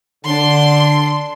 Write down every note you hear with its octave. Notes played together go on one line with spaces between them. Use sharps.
D3 D4 C6